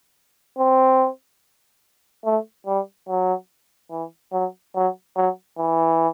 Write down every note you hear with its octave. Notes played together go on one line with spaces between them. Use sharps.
C4
A3
G3
F#3
E3
F#3
F#3
F#3
E3